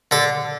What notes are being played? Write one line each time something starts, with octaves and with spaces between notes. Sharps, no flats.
D3 A4